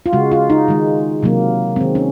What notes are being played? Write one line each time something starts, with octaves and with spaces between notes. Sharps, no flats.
F4
C#3 G#3 F#4
F4
D#4
D#3 G#3
C3 F#3 A#3
D#3 G#3 C4
C#4